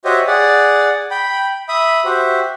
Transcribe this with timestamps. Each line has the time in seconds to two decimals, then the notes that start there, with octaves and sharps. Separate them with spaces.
0.05 F#4 G4 C5 C#5 D#5 E5
0.27 G#4 D5 F#5
1.11 G5 B5
1.69 E5 B5 D#6
2.05 F#4 G4 C5 E5